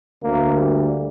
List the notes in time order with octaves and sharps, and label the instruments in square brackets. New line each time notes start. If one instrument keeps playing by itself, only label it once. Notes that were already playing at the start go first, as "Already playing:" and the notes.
[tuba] D2 [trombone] A#3
[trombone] G3